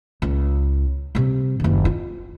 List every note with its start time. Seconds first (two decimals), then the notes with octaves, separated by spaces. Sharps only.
0.22 C#2
1.15 C3 G3
1.60 F#1 D#2
1.85 F4